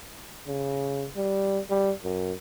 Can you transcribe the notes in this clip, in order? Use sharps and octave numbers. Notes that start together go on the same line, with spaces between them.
C#3
G3
G3
F#2